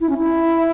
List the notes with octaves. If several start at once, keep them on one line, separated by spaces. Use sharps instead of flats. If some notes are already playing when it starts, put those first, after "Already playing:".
E4
C#4
E4